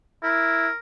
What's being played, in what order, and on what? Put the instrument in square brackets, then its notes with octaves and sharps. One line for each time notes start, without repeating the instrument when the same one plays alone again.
[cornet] E4 [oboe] A#4